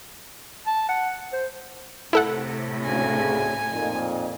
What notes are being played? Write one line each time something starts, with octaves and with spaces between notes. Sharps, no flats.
A5
F#5
C5
A2 C3 E4 A4 F#5
D2 C#3 G#5
F2 A#2 D#4